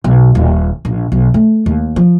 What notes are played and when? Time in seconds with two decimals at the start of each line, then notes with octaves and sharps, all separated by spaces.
0.04 B1
0.35 D#1
0.85 A#1
1.12 B1
1.34 A3
1.66 D#2
1.96 F3